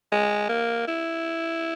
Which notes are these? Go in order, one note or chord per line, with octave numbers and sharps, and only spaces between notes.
G#3
A#3
E4